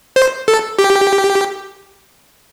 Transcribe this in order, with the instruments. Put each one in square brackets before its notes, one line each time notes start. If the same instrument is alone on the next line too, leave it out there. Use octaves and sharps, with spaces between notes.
[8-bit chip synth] C5
A4
G4